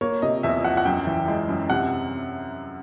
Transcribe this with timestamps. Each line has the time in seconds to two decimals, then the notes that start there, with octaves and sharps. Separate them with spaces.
0.01 A#3 C#5
0.22 C3 D#5
0.43 E2 E5
0.64 F3 F#5
0.77 F#5
0.85 F#2 G5
1.07 E3
1.28 G#3
1.49 F#2
1.70 C3 F#5